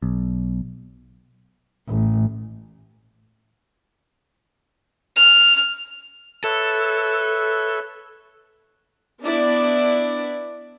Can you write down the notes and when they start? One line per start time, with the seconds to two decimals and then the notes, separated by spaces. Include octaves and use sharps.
0.02 B1
1.87 A1
5.16 F6
6.44 A4 B4 C#5 E5
9.23 B3 D4 E4 D5